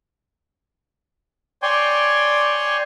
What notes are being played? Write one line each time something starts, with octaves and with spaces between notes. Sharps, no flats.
C#5 D5 G5 G#5 C6